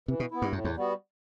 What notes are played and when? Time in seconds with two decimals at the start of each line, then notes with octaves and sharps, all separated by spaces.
0.08 C3 E3
0.20 B2
0.31 B3 E4
0.42 G2
0.53 F#2 A2
0.64 E2
0.76 G3 B3 F#4